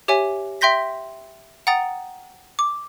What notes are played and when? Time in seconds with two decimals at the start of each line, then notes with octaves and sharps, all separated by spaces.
0.08 G4 C#5 E5 G#5
0.61 E5 G5 C6 G6 A#6 B6
1.67 F#5 G5 A#5 D#6 A6
2.59 D6